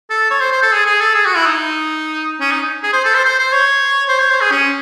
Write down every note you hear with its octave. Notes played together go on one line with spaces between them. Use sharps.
A4
C#5
C5
C5
A4
G#4
G#4
A4
G#4
F#4
E4
D#4
C#4
D#4
G#4
C5
A4
C5
C5
C5
C#5
C5
C#5
C5
G#4
C#4